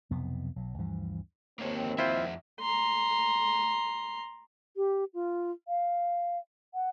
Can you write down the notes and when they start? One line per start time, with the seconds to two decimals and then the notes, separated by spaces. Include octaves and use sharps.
0.11 B1 F2 C3 B3
0.56 B1 F#3
0.78 D2 G2 E3 F3
1.60 D#2 G#2 A#3 C4 C#5
1.98 F2 E4 F4 C5 E5
2.61 A#5 C6
4.76 G4
5.14 F4
5.68 F5
6.74 F#5